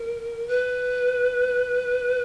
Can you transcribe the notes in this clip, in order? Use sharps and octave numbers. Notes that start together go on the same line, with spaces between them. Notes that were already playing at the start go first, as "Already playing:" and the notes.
Already playing: A#4
B4